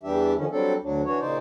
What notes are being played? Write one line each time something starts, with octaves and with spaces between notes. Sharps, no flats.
E2 E3 G3 D4 G4 E5
D3 D#3 F3 C#4
F#3 G3 C4 D4 A4
D2 F#3 D4
E3 D4 F#4 C#5
A#2 C#3 D#4 C5 D5